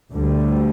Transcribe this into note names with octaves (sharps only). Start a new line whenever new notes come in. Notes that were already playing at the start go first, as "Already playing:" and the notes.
D2 D3 G3